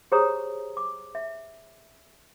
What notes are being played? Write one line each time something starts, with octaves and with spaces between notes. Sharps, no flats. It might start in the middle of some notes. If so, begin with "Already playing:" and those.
G4 G#4 C5 C#5 A#5 D#6
D6
E5